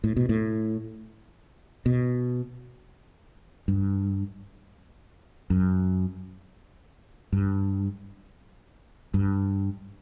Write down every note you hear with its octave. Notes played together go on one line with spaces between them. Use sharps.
A2
B2
A2
B2
G2
F#2
G2
G2